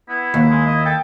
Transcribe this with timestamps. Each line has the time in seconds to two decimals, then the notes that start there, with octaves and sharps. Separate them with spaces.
0.09 B3 E4
0.34 D#2
0.51 G#3
0.67 D#5
0.86 A4 G5